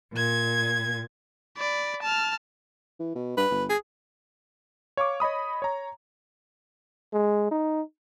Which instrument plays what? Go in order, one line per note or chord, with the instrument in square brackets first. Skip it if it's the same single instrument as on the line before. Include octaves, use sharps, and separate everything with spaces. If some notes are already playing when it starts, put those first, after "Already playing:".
[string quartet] A#2 G#6
[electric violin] D5 B5
A5 F6
[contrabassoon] E3
B2
[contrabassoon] G2 [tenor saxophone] B4
[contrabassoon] G1
[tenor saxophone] G#4
[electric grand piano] C#5 F5 C#6 D6
C#5 D#5 B5 D#6
C#5 A#5
[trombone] G#3
D#4